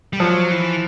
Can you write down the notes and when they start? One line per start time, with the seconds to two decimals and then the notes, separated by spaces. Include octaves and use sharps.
0.13 G3
0.20 F3 F#3
0.51 E3